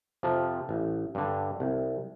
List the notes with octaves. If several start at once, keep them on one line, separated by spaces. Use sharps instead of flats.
F2 C3 F3
A1
G2 D3
C2